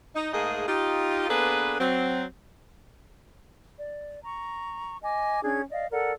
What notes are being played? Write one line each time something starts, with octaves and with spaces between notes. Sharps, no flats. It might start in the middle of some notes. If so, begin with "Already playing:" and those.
D#4
G#2 A3 A#3 D#4 G#4
D#4 F4 G4
A#3 B3 D4 G#4 A4 B4
F#3 C4
D5
A#5 C#6
D#5 G#5 D6
C#4 D4 G#4 G#6
D5 D#5 F5
A4 A#4 D5 F#5